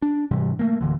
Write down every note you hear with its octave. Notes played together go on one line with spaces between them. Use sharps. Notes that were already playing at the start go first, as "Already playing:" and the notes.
D4
G#2 C3 E3 G3
A3 A#3
D1 D3 E3